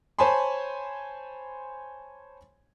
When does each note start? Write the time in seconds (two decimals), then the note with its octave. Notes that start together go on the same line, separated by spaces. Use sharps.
0.19 C5 C#5 G#5 A5 B5 C6